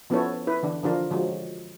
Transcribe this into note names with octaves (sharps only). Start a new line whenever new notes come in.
F3 B3 C#4 E4 A4 C#5
E4 B4
D3 E3 D4
D3 F3 D4 F4 A#4
D3 F3 F#3 G#3